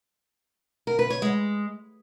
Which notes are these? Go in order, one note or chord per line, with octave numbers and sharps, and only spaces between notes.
A#4
B4
C#5
G#3